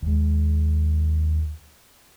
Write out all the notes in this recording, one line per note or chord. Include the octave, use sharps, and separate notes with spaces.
D#2 G#3